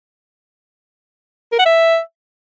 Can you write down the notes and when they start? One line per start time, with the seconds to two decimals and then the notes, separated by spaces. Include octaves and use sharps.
1.52 A#4
1.59 F#5
1.66 E5